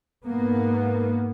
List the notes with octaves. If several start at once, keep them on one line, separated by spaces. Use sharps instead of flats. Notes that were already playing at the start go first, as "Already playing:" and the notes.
G#2 A#3 B3